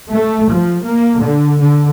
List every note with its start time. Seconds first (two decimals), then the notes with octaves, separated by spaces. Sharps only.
0.11 A3
0.50 F3
0.84 A#3
1.19 D3
1.60 D3